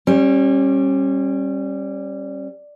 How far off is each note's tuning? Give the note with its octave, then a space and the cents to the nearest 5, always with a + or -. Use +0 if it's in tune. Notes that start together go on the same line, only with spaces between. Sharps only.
G3 +0 C#4 -30